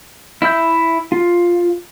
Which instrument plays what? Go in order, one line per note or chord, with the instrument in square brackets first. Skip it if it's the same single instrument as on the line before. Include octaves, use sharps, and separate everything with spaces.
[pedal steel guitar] E4 E5 E6 G6
F4